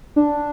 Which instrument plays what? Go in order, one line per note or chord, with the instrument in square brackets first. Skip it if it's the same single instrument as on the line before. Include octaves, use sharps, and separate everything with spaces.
[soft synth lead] D4